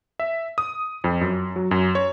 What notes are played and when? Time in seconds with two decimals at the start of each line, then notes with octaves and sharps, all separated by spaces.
0.20 E5
0.58 D#6
1.04 F2
1.21 F#2
1.56 F#3
1.71 F#2
1.95 C#5